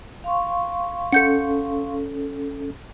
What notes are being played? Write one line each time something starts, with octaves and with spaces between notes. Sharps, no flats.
F5 C6 C#6
C#4 A4 F#5 G6 C#7